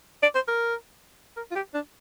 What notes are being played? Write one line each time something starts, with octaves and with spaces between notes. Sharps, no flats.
D5
C5
A#4
A#4
F4
G4
D4